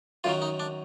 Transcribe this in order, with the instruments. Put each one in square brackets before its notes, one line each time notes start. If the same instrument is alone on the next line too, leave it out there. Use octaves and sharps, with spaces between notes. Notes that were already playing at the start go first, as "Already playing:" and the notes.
[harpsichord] F#2 D#3 F#3 F4
D#4
D4